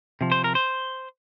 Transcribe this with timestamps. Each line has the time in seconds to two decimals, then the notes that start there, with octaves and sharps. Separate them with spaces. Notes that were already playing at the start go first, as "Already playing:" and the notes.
0.21 C3 F3
0.32 C5
0.44 A#4
0.55 C5